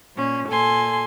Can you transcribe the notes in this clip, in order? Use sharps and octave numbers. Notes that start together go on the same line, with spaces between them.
A#2 C#4
A#2 A4 G#5 C6